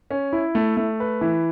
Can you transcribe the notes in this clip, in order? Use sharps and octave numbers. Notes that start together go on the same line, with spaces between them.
C#4
E4
A3
A3
B4
E3